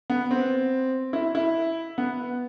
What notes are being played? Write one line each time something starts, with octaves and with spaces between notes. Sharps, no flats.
B3
C4
E4
E4
B3